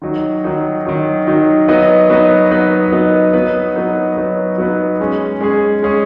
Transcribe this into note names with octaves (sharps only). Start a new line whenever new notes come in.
D#3 F#3 D#4
D#3 F#3 D#4
D#3 F#3 D#4
D#3 F#3 D#4
F#3 B3 D#4 B4 D#5
F#3 B3 D#4 B4 D#5
F#3 B3 D#4 B4 D#5
F#3 B3 D#4 B4 D#5
F#3 B3 D#4 B4
F#3 B3 D#4 B4
F#3 B3 D#4 B4
F#3 B3 D#4 B4
G#3 C#4 G#4
G#3 C#4 G#4
G#3 C#4 G#4